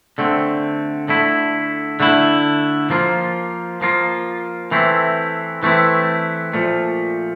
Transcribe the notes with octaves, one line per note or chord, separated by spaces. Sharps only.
D3 A3 C4
D3 A3 E4
D3 A3 E4
F3 A#3 F4
F3 A#3 F4
E3 A3 C4 E4
E3 A3 C4 E4
A#2 F3 A3